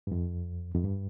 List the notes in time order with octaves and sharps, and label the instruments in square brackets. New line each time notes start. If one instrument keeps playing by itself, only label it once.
[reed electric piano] G2
F2
F2
G2